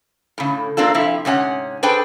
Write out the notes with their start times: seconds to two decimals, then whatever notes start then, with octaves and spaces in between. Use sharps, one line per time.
0.38 A2 C#3
0.77 A#3 C4 D4 F4 A4
0.94 C3 F3 E4 F4
1.25 G#2 C3 C#4 F#5
1.83 D4 G#4 A4 B4 C5 G5